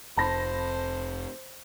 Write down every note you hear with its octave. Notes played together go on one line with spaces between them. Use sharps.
F1 C5 A5 B5 A#6